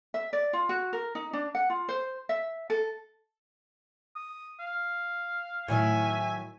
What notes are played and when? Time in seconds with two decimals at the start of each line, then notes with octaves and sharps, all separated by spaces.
0.14 E5
0.33 D5
0.53 F4
0.69 F#4
0.93 A#4
1.15 D#4
1.33 D4
1.55 F#5
1.70 F4
1.89 C5
2.29 E5
2.70 A4
4.16 D#6
4.60 F5
5.68 A2 D#3 F#3 E5 G#5